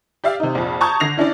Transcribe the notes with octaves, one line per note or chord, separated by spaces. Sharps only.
G4 D5 E5 F5
C3 D#4
A#1 F2
A5 A#5 C#6 D#6 G6 G#6
D3 A#6 C7 F7
C#4 D4 E4 D5